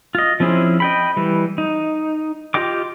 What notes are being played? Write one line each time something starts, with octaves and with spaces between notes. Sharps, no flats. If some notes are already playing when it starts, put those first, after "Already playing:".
F4 D#5
F3 C4 C#4 E4 G#4
D#5 G5 B5
E3 G3
D#4
F4 G4 D#5 G5 D6